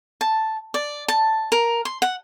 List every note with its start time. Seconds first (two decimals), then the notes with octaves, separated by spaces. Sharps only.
0.21 A5
0.74 D5
1.08 A5
1.52 A#4
1.85 C6
2.02 F#5